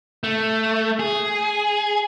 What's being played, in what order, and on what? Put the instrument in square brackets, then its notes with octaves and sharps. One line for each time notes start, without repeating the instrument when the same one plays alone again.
[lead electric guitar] A3
G#4